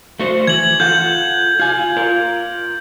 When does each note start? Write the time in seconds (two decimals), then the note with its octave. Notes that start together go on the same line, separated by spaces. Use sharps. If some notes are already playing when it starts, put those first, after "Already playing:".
0.20 A3 F#4 C5
0.47 E3 G#6 F#7
0.80 F4 A4 F#5 G6
1.60 F4 G#5
1.97 F4 A#4